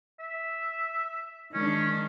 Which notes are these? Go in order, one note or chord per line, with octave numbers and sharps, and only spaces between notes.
E5
D#3 G#3 C#4 D4